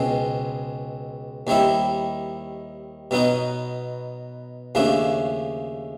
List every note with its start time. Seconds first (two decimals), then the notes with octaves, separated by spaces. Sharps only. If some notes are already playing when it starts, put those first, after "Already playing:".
Already playing: C#2 B2 G#3 C4
1.47 D#2 D#3 G3 C4 E4
3.11 B2 F#3 B3 D#4
4.75 D#2 C#3 F3 A3 D4